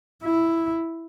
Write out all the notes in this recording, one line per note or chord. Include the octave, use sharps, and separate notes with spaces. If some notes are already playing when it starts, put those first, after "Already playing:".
E4